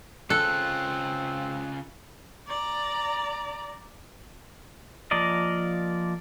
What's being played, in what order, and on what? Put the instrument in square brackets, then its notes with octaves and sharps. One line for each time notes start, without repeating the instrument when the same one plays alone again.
[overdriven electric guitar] C#3 F4 [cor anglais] C4 [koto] A4 [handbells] F#6
[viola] D5 A#5
[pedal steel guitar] F3 A#3 A#4 D5 D#5